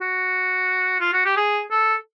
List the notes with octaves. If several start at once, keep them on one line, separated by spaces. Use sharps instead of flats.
F#4
F4
F#4
G4
G#4
A4